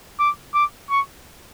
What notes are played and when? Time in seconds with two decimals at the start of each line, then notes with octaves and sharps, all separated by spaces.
0.19 D6
0.54 D6
0.90 C#6